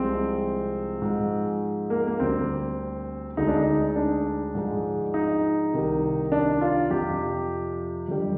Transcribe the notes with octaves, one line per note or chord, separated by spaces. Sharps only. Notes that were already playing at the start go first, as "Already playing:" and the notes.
Already playing: C2 C3 F3 G#3 C4
G#2 F3 G#3
A#3
A#3
D2 D3 G3 C4
D2 D3 G#3 D#4
D4
D#4
D4
G#2 F3 G#3
D#4
C2 C3 D#3
D4
F4
F2 C3 F3 G4
F2 D3 G3